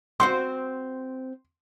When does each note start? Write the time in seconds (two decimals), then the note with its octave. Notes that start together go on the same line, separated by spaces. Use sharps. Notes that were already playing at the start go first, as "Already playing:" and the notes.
0.20 C4 F#4 C5 C6